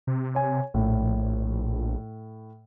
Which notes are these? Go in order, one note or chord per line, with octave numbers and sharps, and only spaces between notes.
C3
C#5 G#5
A#1 A2